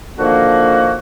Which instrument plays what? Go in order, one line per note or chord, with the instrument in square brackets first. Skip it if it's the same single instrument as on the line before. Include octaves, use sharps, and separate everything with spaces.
[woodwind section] D3 D#3 F3 A#3 F#4